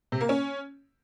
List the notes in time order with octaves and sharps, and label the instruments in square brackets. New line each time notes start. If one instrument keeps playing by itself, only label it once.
[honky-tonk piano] C3
A#3
C#4